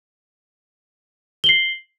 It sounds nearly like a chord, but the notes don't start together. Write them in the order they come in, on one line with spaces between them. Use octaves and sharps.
G7 F#7 C7